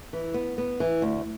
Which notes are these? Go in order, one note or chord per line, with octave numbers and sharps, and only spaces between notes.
E3
B3
B3
E3
D2